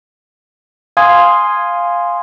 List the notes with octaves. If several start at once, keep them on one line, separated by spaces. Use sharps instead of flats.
F5 G#5 C6 D#6 G#6